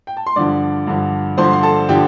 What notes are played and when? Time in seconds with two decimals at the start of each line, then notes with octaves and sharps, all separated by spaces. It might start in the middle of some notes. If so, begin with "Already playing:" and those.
0.07 G5
0.17 A5
0.26 C6
0.36 G2 D3 F3 D5 D6
0.87 G2 D3 F3
1.37 G2 D3 F3 C5 C6
1.53 C6
1.63 A4 A5
1.89 D3 F3 G4 G5